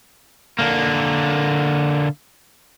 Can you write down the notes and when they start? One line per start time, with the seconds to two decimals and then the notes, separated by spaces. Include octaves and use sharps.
0.59 D3 A#3